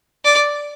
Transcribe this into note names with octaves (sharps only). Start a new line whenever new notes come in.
D5